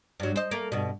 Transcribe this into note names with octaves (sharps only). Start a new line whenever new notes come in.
G2 F#3
C5 D#5
A3 A#3
G2 B2